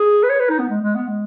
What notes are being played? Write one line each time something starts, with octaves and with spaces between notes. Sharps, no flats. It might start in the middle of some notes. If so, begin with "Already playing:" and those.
Already playing: G#4
B4
C#5
B4
D#4
B3
G#3
G#3
B3
G#3